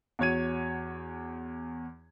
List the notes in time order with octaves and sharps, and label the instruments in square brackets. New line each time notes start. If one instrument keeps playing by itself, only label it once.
[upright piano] E2 F#4 C#5 G#6 D#7